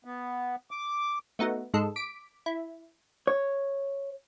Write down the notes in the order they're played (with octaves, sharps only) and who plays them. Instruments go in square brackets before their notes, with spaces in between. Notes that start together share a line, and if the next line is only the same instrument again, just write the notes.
[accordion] B3
D6
[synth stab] A3 B3 D#4 F#4
G#2 G#3 A4
D6 B6 D7
E4
[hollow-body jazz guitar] C#5